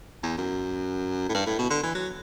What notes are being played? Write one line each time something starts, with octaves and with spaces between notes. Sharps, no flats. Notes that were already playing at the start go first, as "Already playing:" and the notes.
E2
F#2
A2
G2
A2
B2
D3
E3
F#3